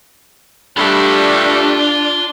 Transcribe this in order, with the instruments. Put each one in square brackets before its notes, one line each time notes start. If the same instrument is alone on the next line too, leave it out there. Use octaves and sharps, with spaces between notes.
[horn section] G2 G3 A3 [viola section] D4 [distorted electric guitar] F4 B5